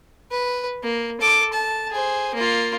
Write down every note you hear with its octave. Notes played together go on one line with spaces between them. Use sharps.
B4
A#3
A4 D6
A5
G#4 C5
A#3 F4